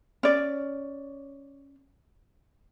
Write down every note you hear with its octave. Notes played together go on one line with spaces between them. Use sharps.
C#4 D5